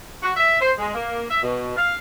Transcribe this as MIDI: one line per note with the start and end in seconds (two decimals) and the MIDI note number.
0.22 0.32 66
0.37 0.59 76
0.61 0.72 72
0.78 0.93 56
0.95 1.23 58
1.30 1.40 76
1.43 1.75 47
1.77 1.94 77